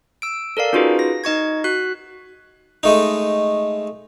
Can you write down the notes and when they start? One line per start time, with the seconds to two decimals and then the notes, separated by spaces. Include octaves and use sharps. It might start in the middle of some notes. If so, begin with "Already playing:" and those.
0.22 E6 D7
0.57 A4 A#4 D5 F5
0.73 C#4 D#4 F4 F#4 G#4 B4
0.99 A#6
1.24 D#4 D#5 C#6 G#6
1.64 F#4 F#6 B6
2.83 G#3 A3 D#4